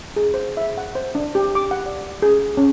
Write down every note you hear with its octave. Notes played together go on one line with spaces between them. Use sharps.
G#4
C5
E5
F#5
C5
D4
G4
D6
F#5
D5
G#4
C#4